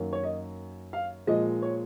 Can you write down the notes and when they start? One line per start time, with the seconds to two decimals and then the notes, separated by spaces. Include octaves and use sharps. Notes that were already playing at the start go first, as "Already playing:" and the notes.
Already playing: F#2 D#3 F#3 A#3
0.13 C#5
0.23 D#5
0.93 F5
1.27 A#2 F3 G#3 D#5
1.62 C#5